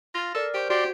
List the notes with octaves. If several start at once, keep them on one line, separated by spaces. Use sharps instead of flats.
F4 A6 A#6
A4 A#4 D5
G4 C5 C#6
F#4 G4 D5 C6